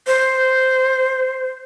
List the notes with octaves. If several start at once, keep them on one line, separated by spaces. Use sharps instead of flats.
C5